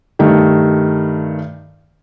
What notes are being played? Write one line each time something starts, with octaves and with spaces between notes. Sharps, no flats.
G2 D#3 A3